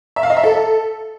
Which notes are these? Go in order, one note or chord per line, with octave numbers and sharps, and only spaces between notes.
E5
F5
D#5
E5
A4